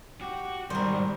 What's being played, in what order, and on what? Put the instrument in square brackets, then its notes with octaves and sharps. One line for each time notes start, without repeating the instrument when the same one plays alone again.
[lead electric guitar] F#4 [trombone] G4
[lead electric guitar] G#2 D#3 [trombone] B2 [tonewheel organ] G3 [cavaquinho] A#4 C5